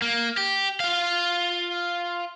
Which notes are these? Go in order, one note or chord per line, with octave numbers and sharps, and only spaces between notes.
A#3
G4
F4 F5